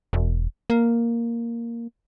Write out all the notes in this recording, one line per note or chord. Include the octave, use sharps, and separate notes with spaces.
E1
A#3